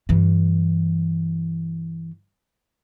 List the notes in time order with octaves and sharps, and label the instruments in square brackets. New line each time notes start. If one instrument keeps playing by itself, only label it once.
[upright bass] G2 E3